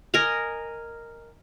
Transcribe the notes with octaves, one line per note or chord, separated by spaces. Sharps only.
A#4 D#5 G#5 A#5